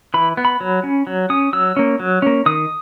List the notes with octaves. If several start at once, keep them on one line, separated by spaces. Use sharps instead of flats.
E3 B5
B3
B5
F#3
C#4
F#3
C#4 D#6
F#3 E6
A#3 C#4
F#3
A#3 C#4
D#3 D#6